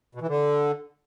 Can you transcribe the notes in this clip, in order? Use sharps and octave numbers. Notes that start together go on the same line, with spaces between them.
B2
E3
D3